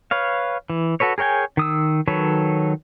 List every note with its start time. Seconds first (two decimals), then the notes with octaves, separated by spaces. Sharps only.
0.11 B4 C#5 F5
0.70 E3
1.00 F#4 A4 B4 C#5
1.18 G#4 A#4 C#5 G5 G#5
1.57 D#3 D#6 E6
2.08 D#3 F#3 A4 B4 C#5